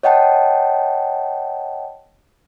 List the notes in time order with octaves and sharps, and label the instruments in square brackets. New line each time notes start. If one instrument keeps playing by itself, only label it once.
[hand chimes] C#5 D#5 F#5 G5 A5